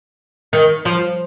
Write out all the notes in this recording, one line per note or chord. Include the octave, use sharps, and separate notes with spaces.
D#3
F3